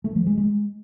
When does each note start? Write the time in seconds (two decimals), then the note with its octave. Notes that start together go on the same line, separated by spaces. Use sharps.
0.04 A3
0.15 F3
0.26 G#3
0.38 G#3